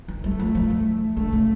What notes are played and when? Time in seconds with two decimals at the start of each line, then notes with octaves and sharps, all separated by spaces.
0.08 E3
0.24 G3 A3
0.39 F3
0.55 F3
0.70 E3
1.17 D3 A3
1.33 C#3